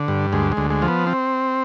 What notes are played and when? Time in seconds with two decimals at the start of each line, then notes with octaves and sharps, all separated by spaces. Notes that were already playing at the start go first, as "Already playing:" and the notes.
Already playing: D3
0.08 G2
0.33 D2 G#3
0.52 G#3
0.57 D2
0.70 G#3
0.82 F3
0.88 B3
1.07 C4